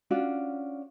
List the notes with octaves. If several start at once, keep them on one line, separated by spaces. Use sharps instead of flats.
C#4 D4 F4 F#4